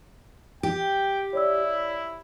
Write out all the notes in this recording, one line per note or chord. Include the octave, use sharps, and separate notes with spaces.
G4 G5
E4 C#5 D5 E6